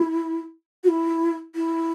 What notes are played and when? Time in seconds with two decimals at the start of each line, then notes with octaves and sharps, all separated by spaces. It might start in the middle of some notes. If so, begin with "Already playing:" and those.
Already playing: E4
0.84 F#4
0.88 E4
1.55 E4